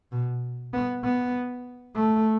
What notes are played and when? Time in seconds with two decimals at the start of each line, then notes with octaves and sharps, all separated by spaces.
0.12 B2
0.73 B3
1.04 B3
1.95 A3